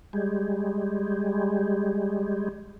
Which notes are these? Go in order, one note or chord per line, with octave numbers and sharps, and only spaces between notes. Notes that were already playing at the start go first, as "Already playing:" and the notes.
G3 G#3